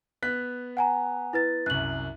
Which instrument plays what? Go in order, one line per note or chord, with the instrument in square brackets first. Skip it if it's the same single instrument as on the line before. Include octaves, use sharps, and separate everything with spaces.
[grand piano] B3 F#6 B6
[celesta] F#5 G#5 A#5
E4 B4 A6
[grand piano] C2 F#2 [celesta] F#6 F#7